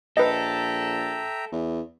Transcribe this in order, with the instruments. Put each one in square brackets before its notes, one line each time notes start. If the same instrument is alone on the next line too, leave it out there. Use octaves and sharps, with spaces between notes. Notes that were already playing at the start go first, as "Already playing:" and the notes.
[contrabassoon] A#1 [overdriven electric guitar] A4 [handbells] B4 D#5 [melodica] E5 G5 A#5
[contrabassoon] E2